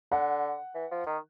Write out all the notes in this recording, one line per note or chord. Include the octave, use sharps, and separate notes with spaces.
D3 F#5
E3
F3
D#3